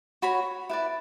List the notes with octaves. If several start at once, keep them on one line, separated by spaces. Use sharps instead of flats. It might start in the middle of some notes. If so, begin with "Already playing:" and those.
F#4 C#5 B5
E4 B4 D5